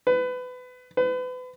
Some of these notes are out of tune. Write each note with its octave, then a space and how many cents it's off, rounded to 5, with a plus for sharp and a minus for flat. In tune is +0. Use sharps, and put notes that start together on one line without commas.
B4 +25
B4 +35